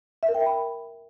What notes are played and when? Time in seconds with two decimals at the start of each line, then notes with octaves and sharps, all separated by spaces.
0.23 E5
0.29 A#4
0.34 G5
0.40 E5
0.46 B5